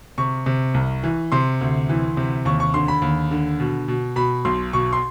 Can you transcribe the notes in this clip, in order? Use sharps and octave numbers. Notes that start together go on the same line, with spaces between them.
C3 C#6
C3
C2
E3
C3 C6
D2
E3
C3
D#2 C#6
C#6
D3 C6
B5
D#2
D3
B2
B2
B2 B5
B1 C6
B2 C#6
C6